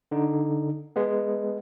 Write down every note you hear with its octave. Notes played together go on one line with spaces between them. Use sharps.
D3 D#4
G#3 B3